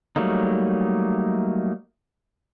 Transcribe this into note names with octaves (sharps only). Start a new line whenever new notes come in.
F#3 G3 A3 A#3 D#4